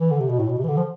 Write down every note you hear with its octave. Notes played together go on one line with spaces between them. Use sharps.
E3
D3
C3
B2
A2
B2
C3
E3
D3
F3